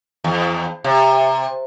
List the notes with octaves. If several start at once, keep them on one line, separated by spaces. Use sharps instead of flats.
E2
C3